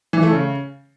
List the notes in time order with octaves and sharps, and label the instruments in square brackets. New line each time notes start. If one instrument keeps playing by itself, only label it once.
[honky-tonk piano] E3
A3
C#3